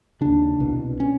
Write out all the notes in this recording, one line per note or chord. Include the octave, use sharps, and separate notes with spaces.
D#2 C#3 D4
C2 B2
C#4